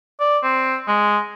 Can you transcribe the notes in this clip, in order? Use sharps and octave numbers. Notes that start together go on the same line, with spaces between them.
D5
C4
G#3